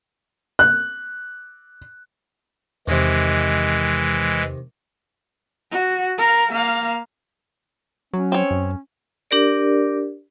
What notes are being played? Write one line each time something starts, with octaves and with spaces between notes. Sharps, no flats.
F#6
E2 C3 D#3 E3 G#3
F#4
A#4 F5
A#3 F5
F#3 C#4
C4 C#5
F#2
D4 G4 A#4 D5